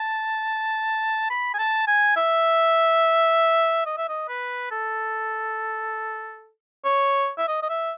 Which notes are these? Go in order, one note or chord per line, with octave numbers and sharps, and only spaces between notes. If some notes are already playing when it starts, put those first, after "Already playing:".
Already playing: A5
B5
G#5
A5
G#5
E5
D#5
E5
D#5
B4
A4
C#5
E5
D#5
D#5
E5